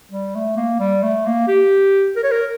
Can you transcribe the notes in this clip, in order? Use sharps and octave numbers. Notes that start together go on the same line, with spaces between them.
G3
A3
A#3
G3
A3
A#3
G4
A#4
C#5
A#4